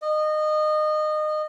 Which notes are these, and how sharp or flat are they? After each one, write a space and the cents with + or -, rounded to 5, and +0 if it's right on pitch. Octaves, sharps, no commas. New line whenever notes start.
D#5 -25